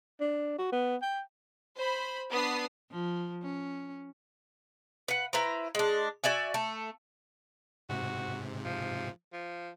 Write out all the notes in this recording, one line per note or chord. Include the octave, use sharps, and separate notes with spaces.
D4
F#4
B3
G5
C5 B5
B3 D4 D#6 C7
F3
C#4
B4 F#5
E4 B4 C5 A#5
G#3 D4
F#4 D5 E5 G#5
A3
G#2 C3 F#4
F3
F3